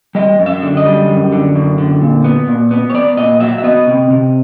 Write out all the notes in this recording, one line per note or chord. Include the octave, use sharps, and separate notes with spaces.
G3 D#5
F#2
E5
D3
D#5
G3
F#2
D3
F#2
D3
A#2
B3
A#2
B3
C#5
B3 D5
A#2 D#5
F#3 E5
E5
B3 D#5
C3
C3